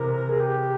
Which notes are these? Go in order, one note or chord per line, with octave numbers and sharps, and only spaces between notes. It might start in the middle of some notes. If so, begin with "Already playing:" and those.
Already playing: C3 E3 A#4
G#4
G4